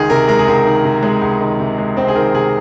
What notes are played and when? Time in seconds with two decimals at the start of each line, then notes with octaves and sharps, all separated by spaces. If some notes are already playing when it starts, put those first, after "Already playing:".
Already playing: C#2 D#3 G#4
0.10 C3 A#4
0.28 G#3 A#4
0.39 G#4
0.47 C#2 A#4
0.66 D#3
0.84 C3
1.03 G#3
1.21 C#2
1.41 D#3
1.60 C3
1.78 G#3
1.97 C#2 C4 C5
2.08 G#4
2.15 D#3 A#4
2.34 C3 G#4